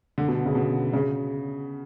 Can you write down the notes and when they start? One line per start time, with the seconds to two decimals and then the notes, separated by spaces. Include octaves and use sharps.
0.18 D3
0.28 B2
0.46 C#3
0.55 B2
0.93 C#3